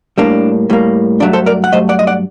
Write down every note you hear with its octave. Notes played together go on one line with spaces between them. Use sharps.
A2 G3 A#3 D4
A2 G3 A#3
G2 F#3 A3 D4
A4 C5
A#4 D5
F#5
G2 F#3 A3 C5 D#5
D5 F#5
D#5
D5 F#5